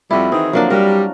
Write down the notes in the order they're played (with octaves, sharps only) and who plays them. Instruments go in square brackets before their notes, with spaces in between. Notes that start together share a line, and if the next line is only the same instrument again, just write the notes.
[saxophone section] F2 G3 [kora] E4 F#4
[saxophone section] D#3 E3 G#4 [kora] C4
[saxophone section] D3 F3 [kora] F#3 A#3 D4
[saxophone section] G3 [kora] F#4 A#4